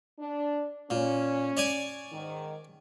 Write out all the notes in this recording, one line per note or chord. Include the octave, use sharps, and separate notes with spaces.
D4
A#2 C#4
C#5 D5 G#5
G#2 D#3